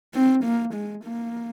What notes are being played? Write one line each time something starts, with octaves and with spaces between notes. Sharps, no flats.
C4
A#3
G#3
A#3